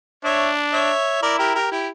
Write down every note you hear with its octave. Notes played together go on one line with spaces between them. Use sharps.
D4 C#5 E5
C#5 E5
E4 A#4 D5
G4 A#4
G4 A#4
E4 G4